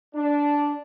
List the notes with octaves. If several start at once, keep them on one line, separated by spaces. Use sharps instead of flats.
D4